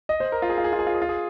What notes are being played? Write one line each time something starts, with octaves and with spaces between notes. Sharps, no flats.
D#5
C5
A#4
F4
G#4
F4
G#4
F4
G#4
F4
G#4
F4
G#4